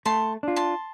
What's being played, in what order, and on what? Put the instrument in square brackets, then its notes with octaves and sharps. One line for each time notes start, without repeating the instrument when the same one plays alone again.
[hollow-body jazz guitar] A3 [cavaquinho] A5 C6
[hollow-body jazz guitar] D4 F4
[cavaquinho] A5 C6